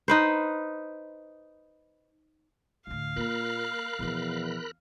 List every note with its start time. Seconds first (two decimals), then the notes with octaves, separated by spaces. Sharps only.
0.08 D#4 B4 C5
2.87 D2 A2 F5
3.16 A#2 A#3 A#4 B5 F#6
3.99 E2 B2 F3